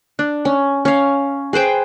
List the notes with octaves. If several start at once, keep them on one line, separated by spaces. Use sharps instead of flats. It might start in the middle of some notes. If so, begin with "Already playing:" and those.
D4
C#4
C#4 F5
G#4 B4 C5 G5